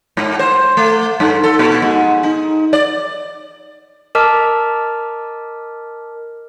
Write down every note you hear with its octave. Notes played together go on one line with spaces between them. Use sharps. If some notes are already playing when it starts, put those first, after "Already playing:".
G#2
C5
A3
G2
A4
A#2
G#2
D#4
D5
A#4 D#5 A5 D6 F6 B6